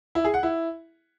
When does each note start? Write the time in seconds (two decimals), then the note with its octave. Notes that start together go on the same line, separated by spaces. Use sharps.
0.15 E4
0.25 G#4
0.34 F#5
0.43 E4